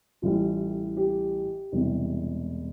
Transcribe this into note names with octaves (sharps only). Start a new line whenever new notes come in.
A1 A2 G3 F4
G4
E1 E2 C3 G3